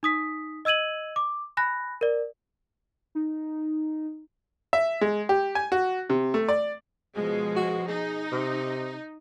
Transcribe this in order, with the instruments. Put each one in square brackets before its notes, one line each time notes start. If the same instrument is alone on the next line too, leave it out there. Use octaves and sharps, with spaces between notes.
[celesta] D#4 D#6 B6
D#5 E6 G#6 D#7 F#7
D6
G#5 B5 F#6 A#6
A#4 D5
[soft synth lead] D#4
[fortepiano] E5
G#3
G4
G#5
F#4
C3
A3
D5
[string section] B2 F3 G#3
[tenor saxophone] F#4
[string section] D#4 [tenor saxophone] G#4
[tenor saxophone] C3